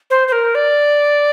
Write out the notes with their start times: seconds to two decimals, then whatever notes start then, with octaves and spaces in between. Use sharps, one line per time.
0.10 C5
0.28 C5
0.32 A#4
0.55 D5